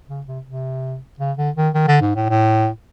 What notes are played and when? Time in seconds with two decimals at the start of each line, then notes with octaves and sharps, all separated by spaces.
0.09 C#3
0.27 C3
0.46 C3
1.19 C#3
1.37 D3
1.56 D#3
1.74 D#3
1.88 D3
2.01 G#2
2.16 A2
2.29 A2